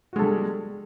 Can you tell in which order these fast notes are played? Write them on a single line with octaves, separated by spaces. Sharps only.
F#4 G#3 A4 G3